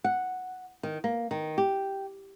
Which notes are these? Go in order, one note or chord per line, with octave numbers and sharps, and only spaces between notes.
F#5
D#3
A#3
D#3
G4